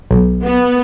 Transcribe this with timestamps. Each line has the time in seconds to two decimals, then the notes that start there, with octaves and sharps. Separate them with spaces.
0.11 B1
0.44 B3